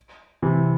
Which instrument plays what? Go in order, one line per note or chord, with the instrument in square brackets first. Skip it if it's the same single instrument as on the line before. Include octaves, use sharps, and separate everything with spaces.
[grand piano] C3 E3